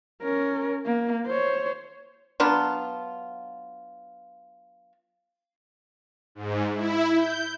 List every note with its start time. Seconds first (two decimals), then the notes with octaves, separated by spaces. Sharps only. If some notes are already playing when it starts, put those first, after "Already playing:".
0.22 C#4 A#4
0.86 A#3
1.27 C5 C#5
2.40 F#3 B3 D4 F4
6.35 G#2
6.75 E4
7.16 G6